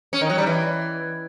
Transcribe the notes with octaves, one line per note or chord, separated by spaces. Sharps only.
C#4
D#3
F#3
G3
E3